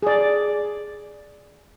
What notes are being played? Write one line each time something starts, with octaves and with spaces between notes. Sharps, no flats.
G#4 D5